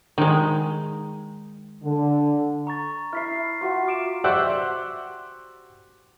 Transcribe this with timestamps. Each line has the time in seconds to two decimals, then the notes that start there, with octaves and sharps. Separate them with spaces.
0.18 D#3 G#3
1.84 D3
2.67 A#5 C#6 A6
3.13 E4 E5 F6 B6 C7
3.61 F4 F#4 E5
3.88 D6 D7 E7
4.24 F#4 G4 C5 D5 E5 F#5